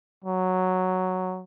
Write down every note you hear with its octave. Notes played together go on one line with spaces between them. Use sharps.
F#3